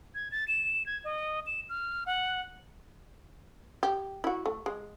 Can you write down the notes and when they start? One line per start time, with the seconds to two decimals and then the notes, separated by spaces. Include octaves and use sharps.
0.15 G#6
0.32 A6
0.48 E7
0.86 G#6
1.04 D#5
1.46 E7
1.69 F6
2.06 F#5
3.83 G4
4.24 E4 F#4
4.46 A3
4.66 G#3